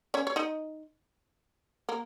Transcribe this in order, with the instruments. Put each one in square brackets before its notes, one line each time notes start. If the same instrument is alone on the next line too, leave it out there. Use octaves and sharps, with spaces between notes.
[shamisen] C#4 C#5
C#5
D#4 D#5
A#3 A#4